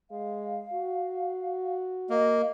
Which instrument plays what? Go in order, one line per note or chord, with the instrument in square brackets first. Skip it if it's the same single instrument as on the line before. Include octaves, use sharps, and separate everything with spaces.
[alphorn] G#3 [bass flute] F5
[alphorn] F#4
[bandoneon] A#3 [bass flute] D#5